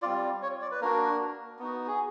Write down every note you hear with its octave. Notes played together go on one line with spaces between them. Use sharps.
G3 C4 F4 D5
C#5
D5
B4
A#3 D4 F#4 A#4
B3 D#4 F#4
G#4